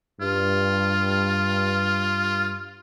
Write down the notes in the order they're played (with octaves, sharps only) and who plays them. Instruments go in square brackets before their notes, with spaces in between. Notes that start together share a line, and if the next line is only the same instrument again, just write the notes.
[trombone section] G2 [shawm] F4